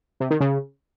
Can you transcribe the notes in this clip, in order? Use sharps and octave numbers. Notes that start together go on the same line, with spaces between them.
C3
D#3
C#3